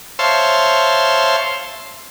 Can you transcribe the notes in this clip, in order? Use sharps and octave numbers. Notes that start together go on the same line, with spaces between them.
C5 C#5 E5 F5 A5 C6